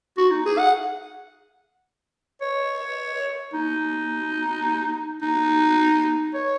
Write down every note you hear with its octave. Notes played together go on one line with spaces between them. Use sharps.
F#4
D#4
G#4
F#5
C#5
D#4
D#4
C#5